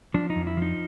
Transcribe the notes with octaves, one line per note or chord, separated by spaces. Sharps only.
F3 D4
D#4
F2
E4
F3 D#4